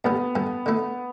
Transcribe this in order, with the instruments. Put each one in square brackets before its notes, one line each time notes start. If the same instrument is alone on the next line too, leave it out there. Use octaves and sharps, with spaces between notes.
[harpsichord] G2 D3 G3 [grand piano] B3
[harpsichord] G2 D3 G3
D3 A3 E4